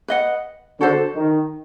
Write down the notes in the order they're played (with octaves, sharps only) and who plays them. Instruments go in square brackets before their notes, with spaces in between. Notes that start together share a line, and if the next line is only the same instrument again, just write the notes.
[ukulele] B4 D#5 F#5
[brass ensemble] D3 [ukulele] F#4 A4 C5
[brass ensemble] D#3